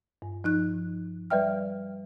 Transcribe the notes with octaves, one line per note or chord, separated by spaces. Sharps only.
G2
F3 D#4 F#6
G3 B4 D5 E5 G5 F6